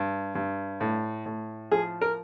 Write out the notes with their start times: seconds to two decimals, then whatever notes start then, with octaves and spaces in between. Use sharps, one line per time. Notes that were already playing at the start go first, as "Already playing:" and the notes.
Already playing: G2
0.35 G2
0.80 A2
1.26 A2
1.71 F3 G#4
2.01 A#4